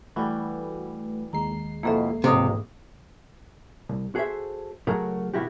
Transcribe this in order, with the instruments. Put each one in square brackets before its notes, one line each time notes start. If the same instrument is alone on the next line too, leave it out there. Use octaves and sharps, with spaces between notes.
[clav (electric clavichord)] E3 G3 [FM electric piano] A3 F#4 B4
[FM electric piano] D#2 G#3 C7 [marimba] A#5
[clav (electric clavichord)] F2 B2 E4 [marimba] A#3 A4 E5
[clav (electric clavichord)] B1 F2 A#3 [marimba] G#2 D6 D#6 [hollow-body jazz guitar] C3
[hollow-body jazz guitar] C2
F#4 G#4 A4 B4 C5 E5
C#3 F#3 A3 F#4 G#4 A#4
B2 D#3 G3 E4 F#4 G4